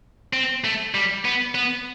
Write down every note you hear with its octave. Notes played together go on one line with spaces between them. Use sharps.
C4
A3
G3
B3
B3